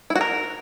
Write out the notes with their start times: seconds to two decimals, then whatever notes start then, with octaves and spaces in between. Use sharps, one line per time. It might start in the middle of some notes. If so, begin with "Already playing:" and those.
0.10 E4
0.15 F#4
0.21 A#4